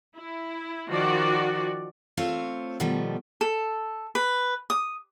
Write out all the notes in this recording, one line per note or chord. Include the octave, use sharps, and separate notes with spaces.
E4
D#3 F3 F#4 D5
A3 C4 F4 C5 C#5
B2 D#3 F3 G3 A3
A4
B4
D#6